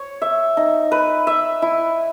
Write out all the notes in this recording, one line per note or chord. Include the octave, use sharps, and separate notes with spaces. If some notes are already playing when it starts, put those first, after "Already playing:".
Already playing: C#5
E5
D#4
B4
E5
E4